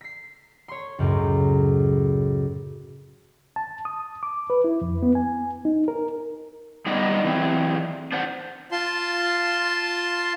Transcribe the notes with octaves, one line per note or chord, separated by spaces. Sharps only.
B6 C7
C#5 C6
C#2 F#2 A2
A5
D#6
D6
B4
E4
F2
B3
G#5
D#4
A#4
G3 B3 D#4 B4 D5 D#5
E3 F#3 C4
D4 C5 F#5
F4 A5 C6